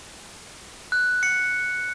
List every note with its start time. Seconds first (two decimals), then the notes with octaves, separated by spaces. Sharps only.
0.92 F#6
1.23 C#7